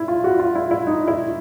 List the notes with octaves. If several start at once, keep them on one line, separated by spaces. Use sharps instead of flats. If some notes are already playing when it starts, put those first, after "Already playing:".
Already playing: E4
F4
F#4
F4
E4
E4
D#4
E4